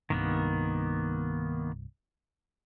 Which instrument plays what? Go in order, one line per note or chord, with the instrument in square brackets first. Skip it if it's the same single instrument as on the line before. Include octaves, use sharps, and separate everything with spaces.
[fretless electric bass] C2 G2 C3 [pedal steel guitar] D#3 A#3 B3